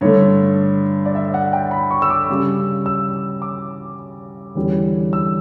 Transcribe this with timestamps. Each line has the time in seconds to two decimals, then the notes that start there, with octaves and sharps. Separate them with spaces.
0.01 G2 D3 A3 C#5
1.05 D5
1.15 E5
1.34 F#5
1.53 G5
1.71 B5
1.91 C#6
2.02 E6
2.10 D6
2.29 C#3 G3 C#4
2.86 E6
3.42 D6
4.55 E2 D3 G3 C#4
5.13 E6